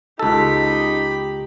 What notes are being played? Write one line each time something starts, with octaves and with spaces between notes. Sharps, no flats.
C#2 D#4 G4 A4 B5